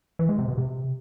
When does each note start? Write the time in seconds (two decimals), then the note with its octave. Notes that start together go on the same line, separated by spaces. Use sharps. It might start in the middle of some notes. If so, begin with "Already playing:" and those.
0.19 E3
0.29 G#3
0.39 C3
0.48 B2
0.58 C3